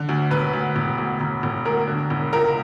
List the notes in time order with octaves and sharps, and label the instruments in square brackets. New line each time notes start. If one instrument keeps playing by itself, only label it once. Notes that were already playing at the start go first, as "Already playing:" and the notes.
Already playing: [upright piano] D3
D2
E1 B4
D2
E1
D2
E1
E1
D2 A#4
D3
E1
C#2 A#4